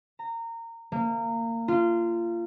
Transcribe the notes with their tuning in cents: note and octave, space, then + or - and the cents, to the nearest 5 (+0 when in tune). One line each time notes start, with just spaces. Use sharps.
A#5 -20
A#3 -25
F4 -25